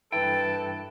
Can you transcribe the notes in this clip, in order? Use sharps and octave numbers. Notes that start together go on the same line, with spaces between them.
G2 E3 E4 A4 B4 G5